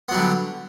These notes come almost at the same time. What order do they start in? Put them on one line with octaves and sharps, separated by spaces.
B3 F#3 G3 D3